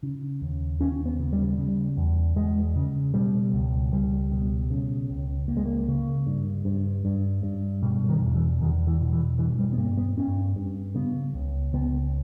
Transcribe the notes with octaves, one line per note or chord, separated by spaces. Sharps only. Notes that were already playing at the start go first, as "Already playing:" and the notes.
C#3
D#2
D#2 C#4
B3
C#3
G3
C#3
E2
E2 G#3
C#3
B2 G3
C#2
C#2 G3
B2
C#3
C#2
C#2 A#3
G#3
A#3
C#3
G2
G2
G2
G2
B2 G3
D#3
E2
E3
E2 D#3
E3
B2
E3
G2 E3
G3
B3
G2 A#3
B3
G2 C#4
G2
C#3 B3
C#2
C#2 B3